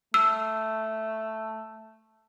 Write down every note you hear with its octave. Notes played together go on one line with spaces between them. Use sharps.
A3 E6